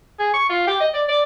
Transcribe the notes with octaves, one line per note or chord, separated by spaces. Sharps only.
G#4
C#6
F4
G4
D#5
D5
D5